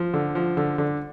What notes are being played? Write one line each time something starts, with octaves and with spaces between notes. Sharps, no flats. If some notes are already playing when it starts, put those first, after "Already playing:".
Already playing: F3
D3
F3
D3
D3